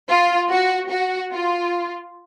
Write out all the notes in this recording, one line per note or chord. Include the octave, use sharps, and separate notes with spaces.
F4
F#4
F#4
F4